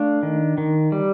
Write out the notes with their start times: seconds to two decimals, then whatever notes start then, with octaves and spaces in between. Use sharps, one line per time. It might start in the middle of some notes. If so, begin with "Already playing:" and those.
Already playing: A3 D4 F5
0.23 D#3
0.58 D#3
0.92 G3